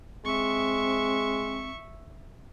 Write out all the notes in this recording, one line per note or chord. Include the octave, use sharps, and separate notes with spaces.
G#3 C4 E5 C#6